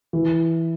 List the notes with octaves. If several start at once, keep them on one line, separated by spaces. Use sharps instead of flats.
E3